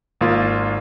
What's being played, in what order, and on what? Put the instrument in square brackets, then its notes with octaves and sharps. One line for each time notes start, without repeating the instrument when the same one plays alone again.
[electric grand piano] G#1 A#3 F4